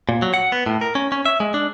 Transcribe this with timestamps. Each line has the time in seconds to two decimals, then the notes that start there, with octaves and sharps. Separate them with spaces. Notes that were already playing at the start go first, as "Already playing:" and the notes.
0.09 A#2
0.22 F#3
0.34 F#5
0.52 B3
0.66 A2
0.81 A#4
0.95 C#4
1.12 C#4
1.26 E5
1.40 G#3
1.54 D4